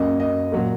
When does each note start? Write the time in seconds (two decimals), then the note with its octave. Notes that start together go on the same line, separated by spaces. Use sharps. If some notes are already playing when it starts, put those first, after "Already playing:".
Already playing: F#2 F#3 A#3 C#4 D#5
0.20 D#5
0.52 A#2 F#3 A#3